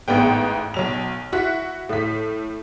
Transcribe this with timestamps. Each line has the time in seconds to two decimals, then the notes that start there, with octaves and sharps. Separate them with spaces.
0.08 A1 G#2 B3 G5
0.74 B1 F#3 F7
1.32 E4 F#4 F#6 B6
1.89 A2 B6